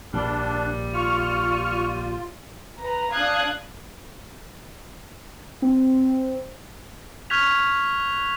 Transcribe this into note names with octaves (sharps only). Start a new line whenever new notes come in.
A#1 G#2 D#3 G3 D4
F4 C#6 F6
B4 A#5
D4 F5 D#6 F#6 G#6
C4
C#6 F6 F#6 G#6 B6 F7